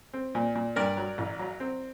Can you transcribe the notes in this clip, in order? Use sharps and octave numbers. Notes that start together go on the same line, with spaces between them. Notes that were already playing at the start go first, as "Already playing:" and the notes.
C4
A#2
A#2
G2 A#4 D5
F#3
A1
F#3
C4